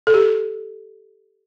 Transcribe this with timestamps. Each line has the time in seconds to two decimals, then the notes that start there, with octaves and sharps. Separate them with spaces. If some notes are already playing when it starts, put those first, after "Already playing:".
0.07 A4
0.14 G4